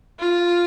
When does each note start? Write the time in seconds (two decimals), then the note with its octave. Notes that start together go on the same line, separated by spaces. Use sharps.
0.20 F4